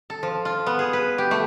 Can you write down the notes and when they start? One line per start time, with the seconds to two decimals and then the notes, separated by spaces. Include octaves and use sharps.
0.10 A4
0.23 F3
0.45 F4
0.66 B3
0.79 G#4
0.93 B4
1.18 G4
1.31 A3